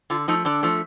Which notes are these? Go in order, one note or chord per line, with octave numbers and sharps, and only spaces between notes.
D3 F4
F3 A3 D#4
D3 D4
F3 A3